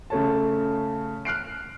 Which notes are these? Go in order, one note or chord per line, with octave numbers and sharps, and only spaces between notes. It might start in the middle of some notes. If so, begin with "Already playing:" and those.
C#3 A3 C#5 A5
F6 F#6 C7 D7